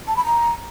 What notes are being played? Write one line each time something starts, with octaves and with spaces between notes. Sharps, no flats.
A5
B5
A#5